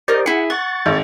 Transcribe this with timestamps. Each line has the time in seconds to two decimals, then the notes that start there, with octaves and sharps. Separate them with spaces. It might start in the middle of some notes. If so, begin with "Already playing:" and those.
0.08 D#4 G4 A#4 C5 D5 D#6
0.26 E4 G#4 F#5
0.50 F#5 C#6 A6
0.86 G#1